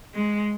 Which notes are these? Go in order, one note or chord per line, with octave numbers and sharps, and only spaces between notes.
G#3